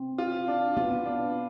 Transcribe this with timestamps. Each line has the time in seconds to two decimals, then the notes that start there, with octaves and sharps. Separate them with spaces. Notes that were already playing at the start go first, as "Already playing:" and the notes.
Already playing: C4
0.18 F4
0.48 D4
0.77 B3 F4
1.06 D4